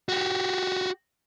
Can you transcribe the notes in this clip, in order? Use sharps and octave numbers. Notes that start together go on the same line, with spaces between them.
F#4 G4